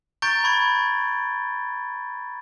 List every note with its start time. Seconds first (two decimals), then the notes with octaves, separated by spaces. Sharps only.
0.22 A#5 C#6 G6 A6 D7 G7
0.44 B5 C#6 G#6